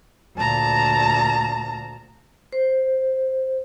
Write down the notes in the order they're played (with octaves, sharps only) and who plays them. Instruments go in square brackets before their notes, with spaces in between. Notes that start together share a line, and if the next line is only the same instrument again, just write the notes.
[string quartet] D2 A#2 A5 A#5
[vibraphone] C5